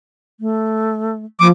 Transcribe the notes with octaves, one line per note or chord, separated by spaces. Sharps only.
A3
F3 A#3 D6